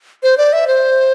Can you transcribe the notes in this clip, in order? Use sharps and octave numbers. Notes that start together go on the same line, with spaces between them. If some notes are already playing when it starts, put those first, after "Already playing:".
C5
D5
E5
C5